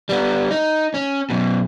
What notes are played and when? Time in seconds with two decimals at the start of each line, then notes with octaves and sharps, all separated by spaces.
0.09 G3 B3
0.51 D#4
0.94 C#4
1.30 F#2 B2